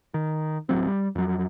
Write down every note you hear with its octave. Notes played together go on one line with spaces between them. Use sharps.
D#3
D1 A1 F#3 C4
G3
F2 F#3